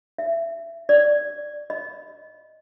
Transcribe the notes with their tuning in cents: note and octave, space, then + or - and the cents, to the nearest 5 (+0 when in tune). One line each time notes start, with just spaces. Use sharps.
E5 +20
D5 +10
D#5 +10